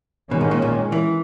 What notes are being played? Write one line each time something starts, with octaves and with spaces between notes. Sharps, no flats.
B2 D#3 G#3 C#4
G#2
A#2
A#2
E3